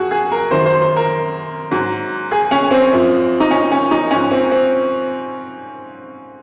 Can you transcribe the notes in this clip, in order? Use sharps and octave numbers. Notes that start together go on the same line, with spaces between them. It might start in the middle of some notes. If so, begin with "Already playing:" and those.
Already playing: F2 F#4 G#4
G#4
A#4
F#2 D#3 F#3 C5
C5
C5
A#4
G#2 F#3
G#4
C#4
C4
F#2 F3
D#4
C#4
C#4
D#4
G#2 F3 C#4
C4
C4